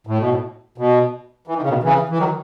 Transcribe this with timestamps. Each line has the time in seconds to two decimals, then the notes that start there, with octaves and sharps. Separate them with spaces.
0.07 A2
0.19 B2
0.30 A2
0.78 B2
1.47 E3
1.55 D#3
1.62 C#3
1.69 B2 D#3
1.83 C#3 E3
2.09 E3
2.18 D#3 F#3